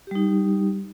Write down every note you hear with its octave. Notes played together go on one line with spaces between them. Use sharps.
G3 D#4 G4